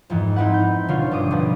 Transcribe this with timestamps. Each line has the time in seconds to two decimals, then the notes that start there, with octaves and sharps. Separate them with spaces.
0.10 F2 G#2 E3
0.36 C4 D#4 E4 B4 F#5
0.54 G6
0.88 D#1 B2 D3 F3 F4 C#5
1.11 G1 G4 D6 D#6
1.31 C2 B2 F3